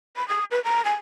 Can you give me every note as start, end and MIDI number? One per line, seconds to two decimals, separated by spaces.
0.16 0.27 83
0.28 0.44 87
0.51 0.62 71
0.64 0.83 82
0.85 0.95 80